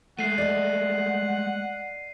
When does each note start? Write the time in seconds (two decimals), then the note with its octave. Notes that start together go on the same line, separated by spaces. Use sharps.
0.19 G#3 A3 F#5 C7 D#7
0.38 D5 D#5